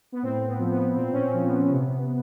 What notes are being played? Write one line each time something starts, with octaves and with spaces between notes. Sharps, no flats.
B3
A2 C4
B3
F3
B3
A#2 C4
C#4
C4
F3
B3
C3